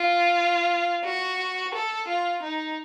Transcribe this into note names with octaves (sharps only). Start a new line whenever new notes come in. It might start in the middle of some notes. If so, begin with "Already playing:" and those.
Already playing: F4
F#4
A4
F4
D#4